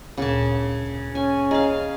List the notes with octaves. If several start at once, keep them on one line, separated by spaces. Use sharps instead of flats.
D2 A#2 C#3 A5
C#4 G#5
G#4 D#5 F5 A#5